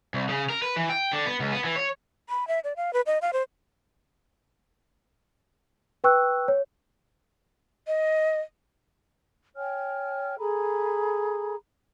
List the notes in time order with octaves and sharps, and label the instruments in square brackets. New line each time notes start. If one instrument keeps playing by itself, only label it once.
[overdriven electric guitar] C2
C#3
A#4
B4
E3
G5
D3
B3
C#2
B3
E3
C#5
[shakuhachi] B5
E5
D5
F5
B4
D#5
F5
C5
[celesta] B4 G5 C#6 E6 F#6
C#5
[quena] D#5
[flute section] C#5 G5 G#5 F6
G#4 A4 A#5 B5